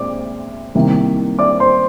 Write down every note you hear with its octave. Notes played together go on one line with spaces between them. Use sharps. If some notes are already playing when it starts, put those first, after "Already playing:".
Already playing: A#2 G#3 C4 D5 D6
C2 C3 D#3 A#3
D5 D6
C5 C6